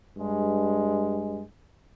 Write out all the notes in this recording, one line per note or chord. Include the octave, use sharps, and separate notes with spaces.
G2 G#3